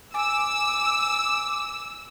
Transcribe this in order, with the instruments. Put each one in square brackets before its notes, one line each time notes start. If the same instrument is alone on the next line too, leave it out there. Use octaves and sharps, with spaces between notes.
[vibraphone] G#5 [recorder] D6 [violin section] E6